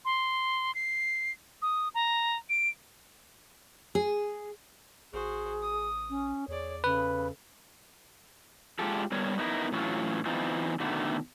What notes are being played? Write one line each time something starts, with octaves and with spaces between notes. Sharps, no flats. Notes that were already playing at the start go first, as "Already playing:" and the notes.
C6
C7
D#6
A#5
D7
G#4
A1 F#4 G#4 C5
D#6
C#4
E2 G#4 C#5 D5
C#3 A4 B4
G#3 F4 G4 A4
G3 B3 A#4 C#5
B3 D#4 E4 A#4
A2 E3 F#3 C#4 F4
E3 B3 C4 D#4 F4
B2 D3 D#3 A3 B3